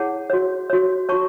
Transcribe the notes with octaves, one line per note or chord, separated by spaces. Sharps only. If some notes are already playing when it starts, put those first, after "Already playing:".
Already playing: E4 G#4 C#5 F#5 A5
F#4 C#5
F#4 C#5
F#4 C#5 A5 C#6